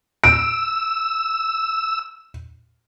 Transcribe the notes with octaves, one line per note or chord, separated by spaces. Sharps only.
E6 D7